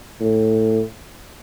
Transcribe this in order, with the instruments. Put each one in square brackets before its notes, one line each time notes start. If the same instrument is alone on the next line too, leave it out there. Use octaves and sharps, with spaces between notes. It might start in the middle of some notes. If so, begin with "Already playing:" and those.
[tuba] A2